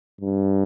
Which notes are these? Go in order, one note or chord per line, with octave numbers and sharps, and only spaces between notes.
G2